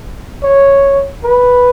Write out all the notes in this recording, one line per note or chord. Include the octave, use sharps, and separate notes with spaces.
C#5
B4